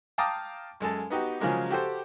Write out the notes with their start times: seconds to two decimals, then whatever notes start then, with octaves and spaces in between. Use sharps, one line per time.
0.18 F5 G5 A5 A#5 D6 D#6
0.80 F#2 G#3 A4 A5
1.10 B3 D#4 F#4 G4
1.40 C#3 F3 F#3 G#3 A#3
1.70 F#4 G4 A4 C5